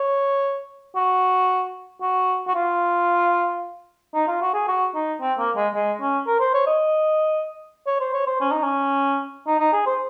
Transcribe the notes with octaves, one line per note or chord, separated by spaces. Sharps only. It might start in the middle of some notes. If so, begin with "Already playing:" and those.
Already playing: C#5
F#4
F#4
F#4
F4
D#4
F4
F#4
G#4
F#4
D#4
C4
A#3
G#3
G#3
C#4
A#4
C5
C#5
D#5
C#5
C5
C#5
C5
C#4
D#4
C#4
D#4
D#4
G#4
C5